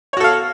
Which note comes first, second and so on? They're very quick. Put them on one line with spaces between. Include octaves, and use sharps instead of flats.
C#5 F#4 A4 F5